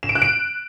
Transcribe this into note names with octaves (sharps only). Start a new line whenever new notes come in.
E7
D7
F#6
D7